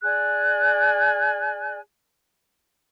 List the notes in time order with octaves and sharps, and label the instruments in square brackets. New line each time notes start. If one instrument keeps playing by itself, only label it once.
[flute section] G#4 D5 G#5 F#6